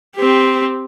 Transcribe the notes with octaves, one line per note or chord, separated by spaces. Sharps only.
C4 G4